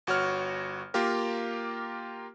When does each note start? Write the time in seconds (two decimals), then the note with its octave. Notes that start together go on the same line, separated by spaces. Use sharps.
0.07 G1 F#4 C#5 F6
0.94 A#3 F4 G4 A#4